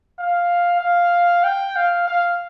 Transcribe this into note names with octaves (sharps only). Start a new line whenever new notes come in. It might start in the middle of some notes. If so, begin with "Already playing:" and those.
F5
F5
G5
F5
F5